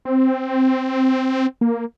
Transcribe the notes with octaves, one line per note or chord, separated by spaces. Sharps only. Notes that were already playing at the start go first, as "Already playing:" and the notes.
C4
A#3